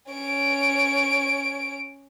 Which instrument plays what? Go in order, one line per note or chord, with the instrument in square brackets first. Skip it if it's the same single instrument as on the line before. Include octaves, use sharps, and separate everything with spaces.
[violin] C#4 D7